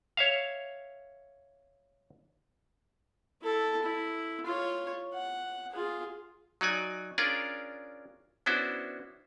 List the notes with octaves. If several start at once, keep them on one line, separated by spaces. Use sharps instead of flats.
C#5 E5 F5
E4 A4
E4
F4 C#5
F#5
F4 G#4
F#3 D#4 D5 G#5
C#4 D4 F4 G#4 A#4 D5
B3 C#4 D4 E4 F#4 C5